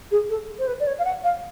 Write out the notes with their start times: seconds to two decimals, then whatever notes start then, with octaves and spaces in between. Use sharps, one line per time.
0.11 G#4
0.29 A4
0.58 C5
0.67 B4
0.79 D5
0.86 C#5
0.98 F5
1.04 F#5
1.23 F5